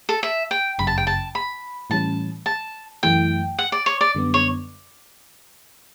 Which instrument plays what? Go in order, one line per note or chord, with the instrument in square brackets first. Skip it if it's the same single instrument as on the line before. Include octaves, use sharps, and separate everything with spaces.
[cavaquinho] A4
E5
G5
[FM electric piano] G1 F#2 C#3 [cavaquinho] B5
[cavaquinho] A5
G5
A5
B5
[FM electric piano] A2 E3 G3 C#4 [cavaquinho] A5
[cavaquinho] A5
[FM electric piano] F#2 E3 A3 E4 [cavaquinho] G5
[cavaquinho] F#5
D5
C#5
D5
[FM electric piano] F#2 D3 G3 B3
[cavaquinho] C#5